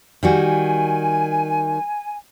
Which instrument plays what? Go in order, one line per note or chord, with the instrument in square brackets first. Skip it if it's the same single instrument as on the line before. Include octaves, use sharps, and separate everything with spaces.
[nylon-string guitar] D#3 G3 F#4 [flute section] G#5